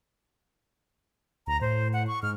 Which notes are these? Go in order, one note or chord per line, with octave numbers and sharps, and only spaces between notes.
D2 A#5
A2 C5
F#5
C#6
G#2 F6